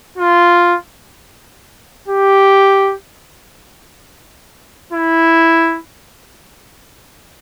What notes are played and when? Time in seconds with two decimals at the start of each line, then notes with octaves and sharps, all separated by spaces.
0.18 F4
2.08 G4
4.93 E4